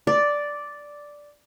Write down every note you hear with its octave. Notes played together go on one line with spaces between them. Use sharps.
D5